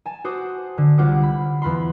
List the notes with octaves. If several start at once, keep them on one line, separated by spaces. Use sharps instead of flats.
G#5 A5
F#4 C5 D6 D#6
D3
C2 F4 C5 F#5 D6
B5
E2 F4 B5 C6